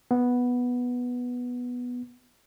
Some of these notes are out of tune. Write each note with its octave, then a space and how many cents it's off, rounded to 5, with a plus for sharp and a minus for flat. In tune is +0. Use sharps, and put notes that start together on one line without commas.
B3 -5